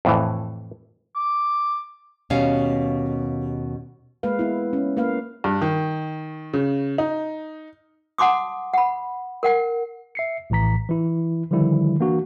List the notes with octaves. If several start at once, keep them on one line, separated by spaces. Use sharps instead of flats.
F2 A2 E3
D6
D#2 B2 G3 C#4 F5
G#3 A#3 B4 F5
B3 E4
C#4
A#3 B4 F5
G2
D#3
C#3
D#4
F#5 A5 C6 D6 D#6
F#5 B5
A#4 F#5 G5
E5 C7 C#7
A#1 A2 E3 A#5 B6
E3 E4
D3 D#3 F3 G3 E4
E3 A#3 D4 F#4